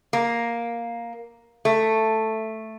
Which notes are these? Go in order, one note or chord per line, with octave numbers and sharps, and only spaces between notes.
A#3
A3